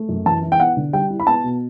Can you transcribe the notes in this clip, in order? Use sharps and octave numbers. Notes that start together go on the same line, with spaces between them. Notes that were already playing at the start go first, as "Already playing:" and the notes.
Already playing: A3
F#2
E3 A5
E4
G5
B3 F#5
D3
G3 G5
E4
B5
B3 A5
B2